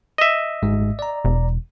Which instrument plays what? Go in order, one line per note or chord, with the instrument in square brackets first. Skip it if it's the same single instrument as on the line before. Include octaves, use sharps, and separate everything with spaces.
[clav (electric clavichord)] D#5 E5
[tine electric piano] G#1 G#2 G#3
D5 A#5
[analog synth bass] E1